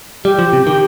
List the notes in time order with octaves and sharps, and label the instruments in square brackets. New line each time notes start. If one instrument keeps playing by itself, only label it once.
[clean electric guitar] G3 [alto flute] G4
[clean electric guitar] F3
C3
[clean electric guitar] D#3 [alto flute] G4